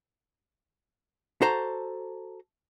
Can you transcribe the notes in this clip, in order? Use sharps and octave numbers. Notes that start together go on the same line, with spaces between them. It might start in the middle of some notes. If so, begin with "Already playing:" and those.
F#4 A4 C5 A5 A#5